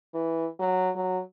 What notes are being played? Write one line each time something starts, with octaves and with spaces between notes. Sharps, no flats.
E3
F#3
F#3